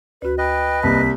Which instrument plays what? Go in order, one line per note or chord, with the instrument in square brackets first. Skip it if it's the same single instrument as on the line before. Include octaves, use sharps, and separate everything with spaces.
[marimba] D2 F#4 [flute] B4
[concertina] B4 D#5 [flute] G5
[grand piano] C2 [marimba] C3 A#3 [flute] B6